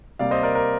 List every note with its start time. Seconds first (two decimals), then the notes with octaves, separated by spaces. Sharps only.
0.19 C3 G3 A#3 D5 F5
0.31 C5 D#5
0.43 A#4 D5
0.55 A#4